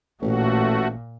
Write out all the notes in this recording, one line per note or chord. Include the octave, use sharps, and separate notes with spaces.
A1 A#2 A3 F#4